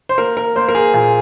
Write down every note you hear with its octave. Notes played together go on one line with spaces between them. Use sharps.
C5
A#3 A#4
A#4
A#3 C5
A#4
G#4
A#2 G#4